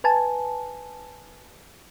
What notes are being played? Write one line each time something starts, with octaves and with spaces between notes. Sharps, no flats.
B4 G#5 A5